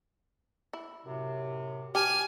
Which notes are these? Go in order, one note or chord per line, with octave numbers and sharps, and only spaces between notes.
E4
F#2 A2 C3
G4 G#5 A5 D6 F6